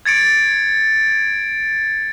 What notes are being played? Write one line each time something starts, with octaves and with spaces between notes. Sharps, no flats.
G#6 A6 C#7 D7